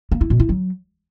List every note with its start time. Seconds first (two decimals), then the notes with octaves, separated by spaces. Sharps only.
0.12 A#3
0.21 E4
0.30 B2
0.40 E4
0.49 F#3